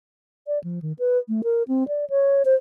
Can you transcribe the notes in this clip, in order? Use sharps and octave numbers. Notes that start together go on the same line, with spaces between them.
D5
F3
D#3
B4
A3
A#4
C4
D5
C#5
C5